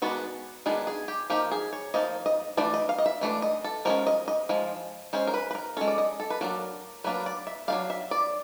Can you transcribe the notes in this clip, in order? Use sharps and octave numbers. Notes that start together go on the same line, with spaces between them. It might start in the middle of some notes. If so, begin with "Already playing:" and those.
D#3 G#3 B3 D4 F#4
D#3 G#3 B3 D4 G#4
G#4
G4
F3 A#3 D#4 G4
G#4
C#5
F3 A#3 D#4 D#5
D#5
E3 A3 D4 D5
D#5
F5
D#5
E5
E3 A3 D4
D#5
A4
F3 G#3 C#4 A#4
D#5
D#5
F3 G#3
G#3 C#4 C5
A#4
B4
B4
A#4
G#3 C#4 A4
D5
D#5
A4
B4
F#3 A#3 D4 A#4
F#3 A#3 D4 B4
D5
E5
F#3 A3 D4 F5
E5
D5